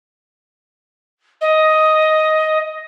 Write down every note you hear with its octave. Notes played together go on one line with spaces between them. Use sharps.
D#5